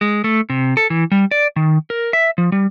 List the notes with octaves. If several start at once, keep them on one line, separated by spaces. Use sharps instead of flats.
G#3
A3
C3
A4
E3
G3
D5
D#3
A#4
E5
F3
G3